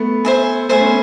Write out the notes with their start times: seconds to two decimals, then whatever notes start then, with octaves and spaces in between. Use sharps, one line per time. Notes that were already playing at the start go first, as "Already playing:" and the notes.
Already playing: A3 B3
0.25 C5 E5 G#5
0.69 A3 B3 C5 E5 G#5
0.80 B3 C#4